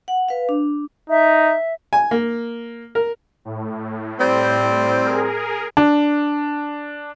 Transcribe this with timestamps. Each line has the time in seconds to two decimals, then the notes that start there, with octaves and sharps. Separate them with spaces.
0.08 F#5
0.29 B4 F5
0.49 D4
1.10 D#4 E5
1.93 G#5
2.11 A#3
2.95 A#4
3.45 A2
4.19 G3 C4
5.04 G#4 A#4
5.77 D4